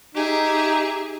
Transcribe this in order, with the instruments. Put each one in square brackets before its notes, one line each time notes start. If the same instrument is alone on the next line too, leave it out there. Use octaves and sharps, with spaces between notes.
[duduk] D#4 [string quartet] G4 G#4 E5